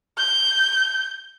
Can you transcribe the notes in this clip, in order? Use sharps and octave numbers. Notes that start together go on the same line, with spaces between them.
G6